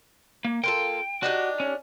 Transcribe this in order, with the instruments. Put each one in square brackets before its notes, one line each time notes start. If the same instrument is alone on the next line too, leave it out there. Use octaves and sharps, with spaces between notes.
[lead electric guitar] A#3
[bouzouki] A#3 F4 A4 [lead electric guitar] G5
[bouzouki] D4 D#4 G4 [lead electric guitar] F#4
[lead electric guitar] C#4